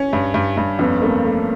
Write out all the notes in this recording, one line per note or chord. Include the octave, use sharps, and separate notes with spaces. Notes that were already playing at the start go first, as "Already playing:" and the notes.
Already playing: C#4
G2
G2
G2
F2 B3 C#4
A3 A#3 C4
A3